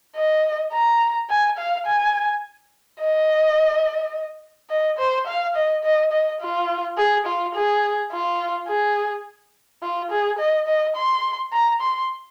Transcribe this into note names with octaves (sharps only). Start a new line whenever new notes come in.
D#5
A#5
G#5
F5
G#5
D#5
D#5
C5
F5
D#5
D#5
D#5
F4
G#4
F4
G#4
F4
G#4
F4
G#4
D#5
D#5
C6
A#5
C6